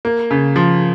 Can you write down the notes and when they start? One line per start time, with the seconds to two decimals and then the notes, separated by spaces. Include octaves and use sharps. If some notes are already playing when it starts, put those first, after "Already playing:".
0.05 A#3
0.31 C#3
0.56 F3